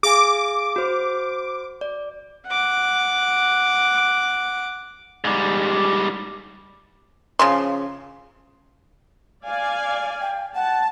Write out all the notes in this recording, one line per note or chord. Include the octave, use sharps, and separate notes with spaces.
G#4 F5 G#5 D6
F#4 C5
D5
F#5 D6
G#2 G3
C#3 F3 C6
D5 F5 G#5
G5
F#5 A5